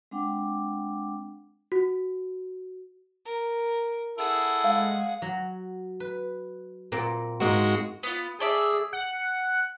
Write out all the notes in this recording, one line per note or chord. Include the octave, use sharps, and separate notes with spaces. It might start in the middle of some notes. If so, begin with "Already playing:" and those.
G#3 C4 D4 F#5 G5 D6
F#4
A#4
E4 G#4 A4 F#5
G#3 F5
F#3
B4
A#2 A#3 C4
G#2 G#3 A#3 C4 F#4
B3 F4
G#4 A4 D5 E5
F#5